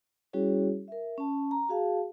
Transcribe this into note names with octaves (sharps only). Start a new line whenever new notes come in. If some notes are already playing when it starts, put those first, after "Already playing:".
G3 C#4 E4 F#4 G#4 C#5
A#4 E5
C#4 A5
A#5
F#4 G#4 F5 A5